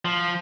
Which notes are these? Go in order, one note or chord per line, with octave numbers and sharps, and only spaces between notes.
F3